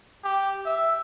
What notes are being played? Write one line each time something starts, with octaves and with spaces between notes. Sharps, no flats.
G4
E5